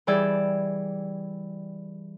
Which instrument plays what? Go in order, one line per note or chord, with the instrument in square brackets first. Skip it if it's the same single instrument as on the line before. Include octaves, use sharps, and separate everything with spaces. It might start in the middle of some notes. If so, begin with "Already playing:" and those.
[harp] E3 G3 G#4 D5 G5 E6